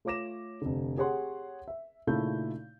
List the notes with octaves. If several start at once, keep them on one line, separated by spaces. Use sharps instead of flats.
A3 F4 C#5 D6 A#6 E7
F1 D3
G4 G#4 C#5 F#5 C6
E5
A#2 C#3 A3 D#4 E4 G6